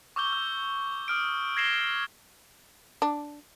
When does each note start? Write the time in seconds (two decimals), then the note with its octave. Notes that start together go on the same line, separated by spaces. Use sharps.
0.16 C#6 D6 E6 G6 G7
0.33 E6
1.08 D#6 F6 D7
1.57 G#6 A#6 C7 E7 G7
3.02 D4